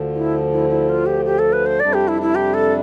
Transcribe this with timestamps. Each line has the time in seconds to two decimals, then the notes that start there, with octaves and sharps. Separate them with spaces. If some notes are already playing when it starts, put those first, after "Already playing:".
Already playing: D2 D3 F3
0.15 E4
0.52 E4
0.70 E4
0.89 F4
1.06 G4
1.25 G4
1.39 A4
1.53 B4
1.66 C5
1.80 F2 C3 G3 D4 D5
1.94 G4
2.08 E4
2.22 E4
2.35 G4
2.54 A4